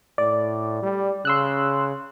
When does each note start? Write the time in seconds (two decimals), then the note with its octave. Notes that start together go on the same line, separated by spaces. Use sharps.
0.18 A2 D5
0.83 G3
1.25 C#3 C6 E6 F#6